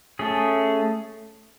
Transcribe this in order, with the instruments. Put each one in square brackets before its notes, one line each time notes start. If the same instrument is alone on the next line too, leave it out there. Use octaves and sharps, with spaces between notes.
[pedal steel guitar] A3 C#4 G#4